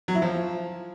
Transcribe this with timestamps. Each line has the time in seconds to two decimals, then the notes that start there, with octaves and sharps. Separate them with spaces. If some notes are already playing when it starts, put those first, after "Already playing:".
0.08 F#3
0.15 E4
0.22 F3